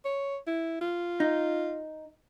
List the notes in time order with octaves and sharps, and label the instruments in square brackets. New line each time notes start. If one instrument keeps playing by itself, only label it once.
[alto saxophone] C#5
E4
F4
[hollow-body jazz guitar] D#4